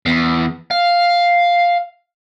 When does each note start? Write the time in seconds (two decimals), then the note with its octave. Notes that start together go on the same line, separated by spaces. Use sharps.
0.06 E2
0.71 F5